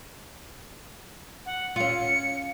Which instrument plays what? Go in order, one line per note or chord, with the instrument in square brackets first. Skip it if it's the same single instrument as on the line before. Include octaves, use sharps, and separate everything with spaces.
[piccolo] F#5
[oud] C#4 F4 [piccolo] C#7